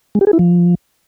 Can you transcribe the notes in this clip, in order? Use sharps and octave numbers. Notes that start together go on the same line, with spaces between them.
G#3
G4
G#4
E4
F3